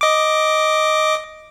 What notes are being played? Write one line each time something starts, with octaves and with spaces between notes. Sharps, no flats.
D#5 D6